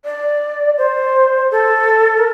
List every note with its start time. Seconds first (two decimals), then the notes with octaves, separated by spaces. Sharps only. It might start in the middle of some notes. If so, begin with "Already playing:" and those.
0.05 D5
0.78 C5
1.51 A4
2.18 A#4